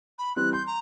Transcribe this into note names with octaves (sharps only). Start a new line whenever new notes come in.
B5
E3 G3 C4 F#6
C6 G6
A#5